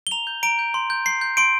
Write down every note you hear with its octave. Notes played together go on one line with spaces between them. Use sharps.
G7
A#5 F7
G6
A#5 D7
G6
C6
G6
C6 C7
G6
C6 D7